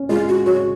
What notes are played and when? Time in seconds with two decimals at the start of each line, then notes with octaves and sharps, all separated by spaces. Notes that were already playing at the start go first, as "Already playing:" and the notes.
Already playing: C#4
0.09 G#3 F4
0.28 F#4
0.46 F#4 C#5